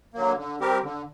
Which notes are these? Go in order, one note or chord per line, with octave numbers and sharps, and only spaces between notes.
D3 F#3 A#3
D3
G3 C4 G4 A#4
D3